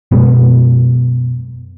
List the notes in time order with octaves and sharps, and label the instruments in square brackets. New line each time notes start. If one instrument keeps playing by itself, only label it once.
[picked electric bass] F#2 B2 G#3 B3